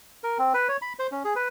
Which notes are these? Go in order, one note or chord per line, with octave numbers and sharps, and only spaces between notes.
A#4
C4
B4
C#5
B5
C5
C#4
G#4
B4